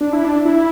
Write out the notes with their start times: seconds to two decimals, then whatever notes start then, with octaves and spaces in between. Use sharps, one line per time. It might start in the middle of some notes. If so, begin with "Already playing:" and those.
0.01 D4
0.13 E4
0.25 D4
0.45 E4